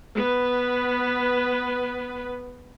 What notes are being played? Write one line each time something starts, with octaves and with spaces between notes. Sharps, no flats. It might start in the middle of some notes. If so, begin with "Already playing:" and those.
B3 B4